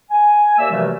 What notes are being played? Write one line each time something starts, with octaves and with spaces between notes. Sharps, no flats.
G#5
D#2 A#3 D5 E5 E6
F#2 C3 E3 F3 G3 A3